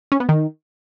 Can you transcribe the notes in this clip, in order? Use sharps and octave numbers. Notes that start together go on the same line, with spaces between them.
C#4
B3
D#3